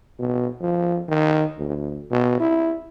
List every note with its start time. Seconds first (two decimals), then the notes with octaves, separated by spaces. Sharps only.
0.19 B2
0.61 F3
1.08 D#3
1.58 D2
2.10 B2
2.40 E4